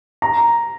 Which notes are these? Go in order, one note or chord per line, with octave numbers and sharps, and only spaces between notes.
A#5